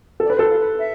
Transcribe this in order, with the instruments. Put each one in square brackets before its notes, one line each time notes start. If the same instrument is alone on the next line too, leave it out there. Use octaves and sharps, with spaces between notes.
[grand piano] A4
[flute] D5
[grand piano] B4
[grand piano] A4 [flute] C5
[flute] F4
B4
E5